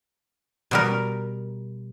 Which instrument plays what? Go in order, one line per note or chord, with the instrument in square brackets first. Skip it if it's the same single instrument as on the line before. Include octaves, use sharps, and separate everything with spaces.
[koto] B2 G3 A#4